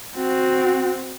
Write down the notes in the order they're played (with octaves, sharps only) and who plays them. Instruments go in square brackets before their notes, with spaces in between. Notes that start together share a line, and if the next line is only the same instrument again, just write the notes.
[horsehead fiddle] C4 F#4